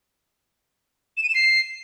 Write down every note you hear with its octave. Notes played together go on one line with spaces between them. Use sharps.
E7
D#7
E7
C7